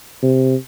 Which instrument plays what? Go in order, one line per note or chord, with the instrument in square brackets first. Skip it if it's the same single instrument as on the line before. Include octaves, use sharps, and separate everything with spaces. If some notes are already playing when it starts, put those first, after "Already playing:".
[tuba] C3